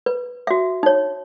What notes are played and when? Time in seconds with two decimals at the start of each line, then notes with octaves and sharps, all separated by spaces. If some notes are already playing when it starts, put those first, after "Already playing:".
0.06 B4
0.47 F#4 E5
0.83 D#4 C#5